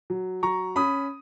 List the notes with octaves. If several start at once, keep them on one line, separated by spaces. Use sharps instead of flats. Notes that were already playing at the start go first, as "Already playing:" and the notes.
F#3
F#3 A#5 C#6
C#4 B5 D#6